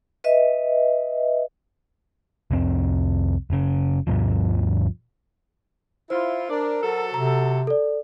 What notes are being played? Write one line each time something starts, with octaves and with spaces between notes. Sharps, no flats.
B4 D#5 E5
C2 F2 C4
F#1 C#3
D2 G2 B2 F3
E4 F4 C5
D4 A#4
F#3 F#4 A4
C3 A#5
A4 D5